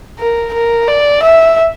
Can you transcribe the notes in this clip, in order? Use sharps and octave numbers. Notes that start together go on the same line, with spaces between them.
A#4
A#4
D5
E5